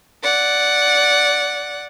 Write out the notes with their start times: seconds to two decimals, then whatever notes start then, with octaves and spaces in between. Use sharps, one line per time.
0.23 D5 F#5